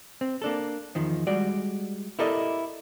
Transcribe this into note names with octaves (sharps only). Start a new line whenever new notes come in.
C4
A#3 D4 A4
E2 D#3 F3
G3 G#3 F#4 D5
E4 G4 A4 A#4 D5 D#5